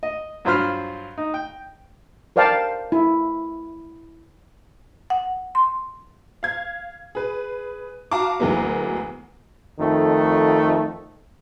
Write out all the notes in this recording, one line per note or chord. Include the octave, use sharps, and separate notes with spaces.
D#5
G2 F#3 F4 C5 B5 F6
D#4
G5
A#4 C5 D5 F5 G5 A5
E4
F#5
C6
F5 G#6
G#4 B4
F#4 F5 A5 A#5 D6
D2 E3 F#3 G#3 A#3 B3
F2 D#3 A3